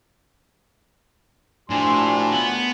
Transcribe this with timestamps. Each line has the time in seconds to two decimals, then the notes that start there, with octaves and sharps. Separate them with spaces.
1.70 A#1 A2 D4 F#4 G#5 C6
2.32 B3